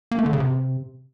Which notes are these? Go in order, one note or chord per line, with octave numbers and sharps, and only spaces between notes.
A#3
A3
D3
C#3
C3